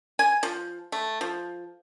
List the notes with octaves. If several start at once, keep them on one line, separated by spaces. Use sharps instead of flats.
G#5
F3
A3
F3